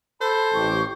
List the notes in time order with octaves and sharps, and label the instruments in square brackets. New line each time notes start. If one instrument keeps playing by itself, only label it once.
[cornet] A4 [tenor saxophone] C5 [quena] B5
[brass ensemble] A1 G4 [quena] C#6